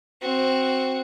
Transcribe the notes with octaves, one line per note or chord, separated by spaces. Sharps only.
C4 F#4